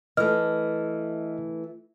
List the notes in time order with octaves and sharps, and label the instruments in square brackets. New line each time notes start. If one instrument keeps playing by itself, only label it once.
[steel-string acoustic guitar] E3 A3 [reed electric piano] D#5 [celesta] F6